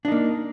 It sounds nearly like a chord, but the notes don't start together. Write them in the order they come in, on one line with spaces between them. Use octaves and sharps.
D4 D#4 A#3